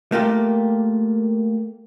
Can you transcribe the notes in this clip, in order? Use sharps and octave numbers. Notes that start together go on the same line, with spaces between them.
A3 A#3 F4 G4